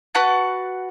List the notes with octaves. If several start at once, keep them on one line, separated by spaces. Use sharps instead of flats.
F#4 B4 F#5 A5